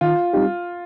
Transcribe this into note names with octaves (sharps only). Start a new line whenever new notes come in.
D#3 F4
G3 C4 D#4 G4